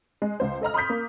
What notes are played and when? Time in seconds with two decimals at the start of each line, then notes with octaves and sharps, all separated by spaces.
0.22 G#3
0.40 C#2 C5
0.62 A4 D#5 A#5 F6
0.74 B5 C6 D#6 G6 B6
0.90 A#3